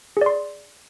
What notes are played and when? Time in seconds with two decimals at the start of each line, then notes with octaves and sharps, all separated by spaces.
0.17 G#4
0.21 D5
0.26 C6